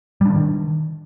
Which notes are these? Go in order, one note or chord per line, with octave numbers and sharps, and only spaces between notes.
D3 D#3 G3 D4